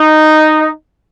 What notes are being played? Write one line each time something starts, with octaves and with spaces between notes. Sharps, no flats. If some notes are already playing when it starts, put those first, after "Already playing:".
Already playing: D#4